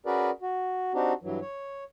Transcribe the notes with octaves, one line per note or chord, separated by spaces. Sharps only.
C#4 F#4 G#4 A#4 B4 D5
F#4
C4 D4 D#4 F#4 G4
G2 E3 F#3
C#5